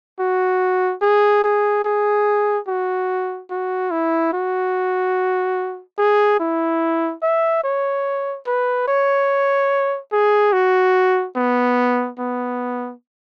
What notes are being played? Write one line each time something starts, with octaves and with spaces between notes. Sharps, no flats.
F#4
G#4
G#4
G#4
F#4
F#4
E4
F#4
G#4
E4
E5
C#5
B4
C#5
G#4
F#4
B3
B3